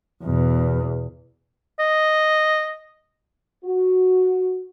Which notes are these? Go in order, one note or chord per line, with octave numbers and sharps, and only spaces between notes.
E2 B2
D#5
F#4